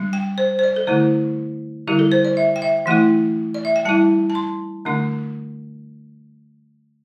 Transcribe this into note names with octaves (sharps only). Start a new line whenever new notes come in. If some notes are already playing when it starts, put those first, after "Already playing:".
Already playing: G3 D4
G5
C5
C5
D5
A4
D3 A3 E4 C5
D3 G3 E4 G4
A4
C5
D5
E5
G5
E5
E3 A3 E4 G5
D5
E5
G5
G3 E4 A5
A5
C6
D3 A3 D4